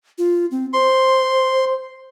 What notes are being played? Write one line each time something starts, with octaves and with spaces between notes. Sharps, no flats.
F4
C4
C5 C6